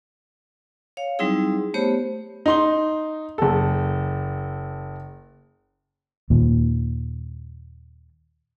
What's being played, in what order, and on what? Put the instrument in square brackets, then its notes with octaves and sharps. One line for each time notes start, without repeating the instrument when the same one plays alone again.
[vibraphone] C#5 F5
F#3 G3 C4 D#4 E4 G#4
A3 B3 G4 C5 C#5
[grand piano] D#4 C6 G7
F#1 A4
[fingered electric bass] D#2 A#2